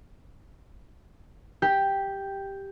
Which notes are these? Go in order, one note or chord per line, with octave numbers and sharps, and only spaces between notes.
G4